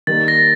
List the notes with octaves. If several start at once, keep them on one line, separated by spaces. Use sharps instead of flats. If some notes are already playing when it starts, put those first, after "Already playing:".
D#3 G3 A#3 A6
A#6